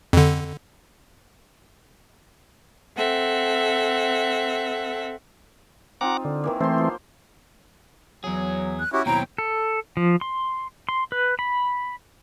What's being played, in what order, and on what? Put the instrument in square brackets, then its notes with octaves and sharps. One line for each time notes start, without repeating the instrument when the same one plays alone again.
[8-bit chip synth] F2 D3
[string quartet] C4 A4 E5 F#5
[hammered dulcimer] C4 D#4 F4 [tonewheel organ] F#5 A#5 D6
[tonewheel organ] D3
[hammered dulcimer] D#3 E3 A#3
[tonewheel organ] E3 A3 C4 [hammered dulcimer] C5 C6
[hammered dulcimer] F3
[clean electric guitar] E2 G#4 [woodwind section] F#3
[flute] F#6
[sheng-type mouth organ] C#4 E4 F#4 [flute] G4
[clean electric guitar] D#2 B2 C4 [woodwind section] F#3 E4 [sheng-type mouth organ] G5 [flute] A#5
[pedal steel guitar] A4
F3
C6
C6
B4
B5